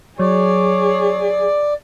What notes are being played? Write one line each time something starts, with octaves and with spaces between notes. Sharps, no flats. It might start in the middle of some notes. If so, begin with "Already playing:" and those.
F#3 G#4 C#5 D5